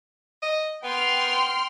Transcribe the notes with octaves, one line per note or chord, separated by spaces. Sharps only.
D#5
B3 G5 C6 F6